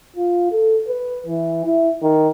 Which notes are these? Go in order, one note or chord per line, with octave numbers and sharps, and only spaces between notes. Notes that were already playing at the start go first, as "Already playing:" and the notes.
F4
A4
B4
E3
E4
D#3